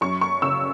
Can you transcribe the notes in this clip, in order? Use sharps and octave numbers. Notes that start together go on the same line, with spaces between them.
F#2 C#6
C#6
C#3 E6